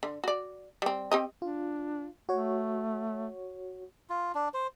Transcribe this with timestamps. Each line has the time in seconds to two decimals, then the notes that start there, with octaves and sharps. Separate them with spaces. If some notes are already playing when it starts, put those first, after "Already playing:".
0.03 D3
0.24 F#4 D5
0.82 G3 C4
1.11 C4 G4 D#5
1.42 D4 F4
2.29 A3 F#4 C#5
4.10 F4
4.35 D4
4.54 C5